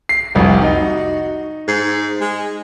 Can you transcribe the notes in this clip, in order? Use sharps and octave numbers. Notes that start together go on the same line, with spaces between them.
C7
F1 C2 G3 F#4
D#4
G#2
G#3